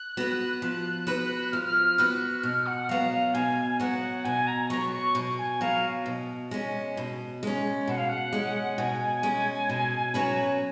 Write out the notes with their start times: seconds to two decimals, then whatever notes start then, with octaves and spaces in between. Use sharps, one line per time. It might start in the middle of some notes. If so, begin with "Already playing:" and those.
Already playing: F#6
0.17 B3 F#4 B4
0.62 F3
1.07 B3 F#4 B4
1.52 F3 F6
1.98 B3 F#4 B4 F#6
2.43 B2 F6
2.66 F#5
2.89 F#3 B3 F5
3.11 F5
3.34 B2 G#5
3.70 G#5
3.79 F#3 B3 F#5
4.24 B2 G#5
4.47 A#5
4.69 F#3 B3 C#6
4.92 C#6
5.15 B2
5.38 G#5
5.61 F#3 B3 F5
6.06 B2
6.51 G#3 C#4
6.97 B2
7.43 G#3 C#4
7.87 B2 F#5
7.97 F5
8.09 F#5
8.33 G#3 C#4
8.78 B2 G#5
9.23 G#3 C#4
9.69 B2
10.14 F#3 C#4 F#4 B4